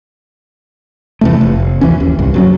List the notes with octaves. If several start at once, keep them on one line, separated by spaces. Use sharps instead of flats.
E2 C3 A3
F1
D2 E3 C#4
D#2
C2 G2
F#1 F#3 C#4